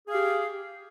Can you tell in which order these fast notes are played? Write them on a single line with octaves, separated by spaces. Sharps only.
G#4 F5 G4